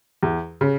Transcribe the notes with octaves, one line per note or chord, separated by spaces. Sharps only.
E2
C#3